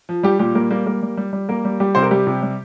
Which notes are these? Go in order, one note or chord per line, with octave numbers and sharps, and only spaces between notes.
F3
G3 G4
A#2 G3 G4
G3 A#3 A#4
G3 A#3 A#4
G3 A#3 A#4
G3
G3
G3
G3 A#3 A#4
G3
G3 G4
C3 C5
A#4
G3 G4
C3
G3